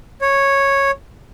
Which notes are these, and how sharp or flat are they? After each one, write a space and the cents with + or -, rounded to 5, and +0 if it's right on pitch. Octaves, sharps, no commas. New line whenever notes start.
C#5 -5